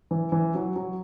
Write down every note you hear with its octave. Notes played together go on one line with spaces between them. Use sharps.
E3
E3
F#3
F#3